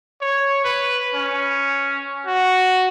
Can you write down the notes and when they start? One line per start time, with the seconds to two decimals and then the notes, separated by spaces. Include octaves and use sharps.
0.21 C#5
0.64 B4
1.15 C#4
2.26 F#4